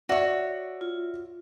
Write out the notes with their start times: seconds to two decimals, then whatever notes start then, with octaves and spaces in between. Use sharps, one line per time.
0.09 F#4 C#5 D5 E5
0.81 F4